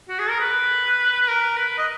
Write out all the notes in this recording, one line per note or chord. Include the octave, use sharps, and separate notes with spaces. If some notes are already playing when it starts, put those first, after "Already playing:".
F#4
G#4
A#4
B4
B4
A#4
B4
D#5